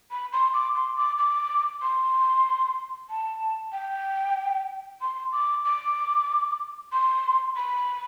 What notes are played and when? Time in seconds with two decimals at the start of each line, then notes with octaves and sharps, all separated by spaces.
0.11 B5
0.33 C6
0.54 D6
0.75 C6
0.97 D6
1.18 D6
1.82 C6
3.10 A5
3.72 G5
5.01 C6
5.32 D6
5.65 D6
6.92 C6
7.56 B5